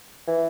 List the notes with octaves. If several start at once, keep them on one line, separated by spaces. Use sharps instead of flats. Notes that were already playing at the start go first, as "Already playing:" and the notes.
E3